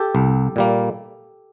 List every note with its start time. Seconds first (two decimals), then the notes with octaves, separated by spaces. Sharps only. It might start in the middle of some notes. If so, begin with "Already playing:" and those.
Already playing: G4 A4
0.15 C2
0.56 A#2 G3 A#3